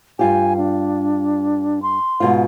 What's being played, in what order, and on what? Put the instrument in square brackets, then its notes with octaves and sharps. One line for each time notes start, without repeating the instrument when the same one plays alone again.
[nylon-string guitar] G2 F4 G4 [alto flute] G#5
[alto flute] D4
C6
[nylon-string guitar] G#2 B2 F4